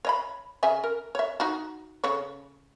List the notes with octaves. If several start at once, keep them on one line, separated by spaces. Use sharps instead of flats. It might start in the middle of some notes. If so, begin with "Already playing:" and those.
C#5 D#5 B5
C#3 E5 G#5
A#4
C#5 E5
D#4 F#4
C#3 A4 C#5